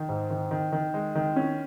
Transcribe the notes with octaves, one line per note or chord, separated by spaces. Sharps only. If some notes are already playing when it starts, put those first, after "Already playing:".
Already playing: D#3
G#2
D#3
D#3
D#3
G#3
D#3
C#4